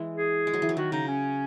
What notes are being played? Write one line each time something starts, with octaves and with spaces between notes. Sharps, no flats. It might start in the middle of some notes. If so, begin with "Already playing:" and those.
Already playing: E3 G#3
G#4
G#3
F#3
E3
F#3
D#3 F#4
C#3 D#4
C#4